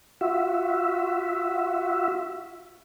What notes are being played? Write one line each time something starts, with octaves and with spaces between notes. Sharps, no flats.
F4 F#4 E5